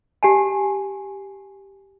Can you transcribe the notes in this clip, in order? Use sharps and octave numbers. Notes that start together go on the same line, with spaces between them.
G4 G#5 A5